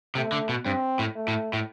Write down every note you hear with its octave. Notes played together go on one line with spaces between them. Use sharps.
C3 A3
D3
B2
G2 C4
A2
A3
A2
A2